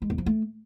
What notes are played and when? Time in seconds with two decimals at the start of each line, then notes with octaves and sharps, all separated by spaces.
0.02 G#3
0.10 E2
0.18 F3
0.26 A3